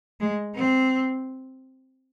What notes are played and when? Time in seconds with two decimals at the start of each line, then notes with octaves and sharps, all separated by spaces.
0.20 G#3
0.56 C4